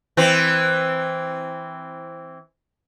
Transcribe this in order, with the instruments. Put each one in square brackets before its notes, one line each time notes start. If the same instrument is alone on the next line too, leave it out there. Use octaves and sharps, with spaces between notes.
[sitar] E3 C4